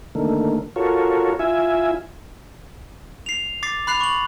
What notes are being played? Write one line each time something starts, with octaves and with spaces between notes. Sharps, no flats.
D3 D#3 A3 A#3
F4 F#4 A4 A#4 C#5
E4 F4 E5 G#5
C7 F7
D6 A6 C7
B5 F#6 C7 F7
C#6 F#7